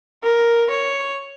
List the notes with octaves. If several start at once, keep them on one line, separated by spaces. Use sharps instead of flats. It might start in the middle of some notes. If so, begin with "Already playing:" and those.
A#4
C#5